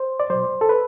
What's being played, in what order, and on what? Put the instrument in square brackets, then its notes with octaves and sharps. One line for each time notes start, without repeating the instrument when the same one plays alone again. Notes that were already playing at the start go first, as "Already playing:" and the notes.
Already playing: [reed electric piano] C5
D5
B2 F#3 C5
A4
B4